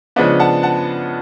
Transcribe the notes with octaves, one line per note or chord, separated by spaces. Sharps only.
C#3 F3 G#3 B3 D4
F#5 A5
F#5 A5